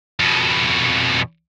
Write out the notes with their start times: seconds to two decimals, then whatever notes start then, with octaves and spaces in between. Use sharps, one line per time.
0.20 F2 B2